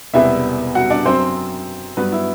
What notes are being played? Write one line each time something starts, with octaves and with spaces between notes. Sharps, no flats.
E1 E2 C3 G3 B3 E4 E5
F#4 F#5
D4 D5
F#2 F#3 C4 C5
G2 F#3 B3 B4
E4